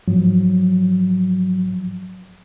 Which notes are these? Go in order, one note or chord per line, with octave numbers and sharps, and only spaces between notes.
G#2 F3 F#3